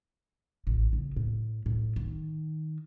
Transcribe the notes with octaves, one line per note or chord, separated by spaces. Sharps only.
A1
C#3
A2
A2
D#3